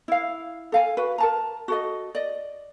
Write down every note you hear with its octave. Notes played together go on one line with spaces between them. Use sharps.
E4 F5
A4 F5 G#5
F#4 B4
A#4 A5 A#5
F#4 A4 D#5
D5 D#5